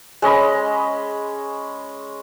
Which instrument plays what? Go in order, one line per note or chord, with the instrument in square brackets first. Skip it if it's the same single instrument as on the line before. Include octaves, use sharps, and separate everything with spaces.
[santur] G#3 C#4 D#5 B5